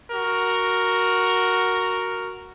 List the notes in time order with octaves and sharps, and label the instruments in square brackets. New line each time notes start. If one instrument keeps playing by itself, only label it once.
[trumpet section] F#4 A#4